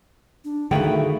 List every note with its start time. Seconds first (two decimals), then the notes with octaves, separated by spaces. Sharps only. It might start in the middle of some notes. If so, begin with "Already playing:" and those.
0.44 D4
0.71 D3 D#3 A3 E4 F#4 G#4 F5 G5